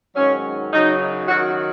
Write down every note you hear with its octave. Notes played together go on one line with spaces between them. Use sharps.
G#2 D#3 F#3 C#4
F#2 C#3 F#3 D#4
F#2 D#3 F#3 F#4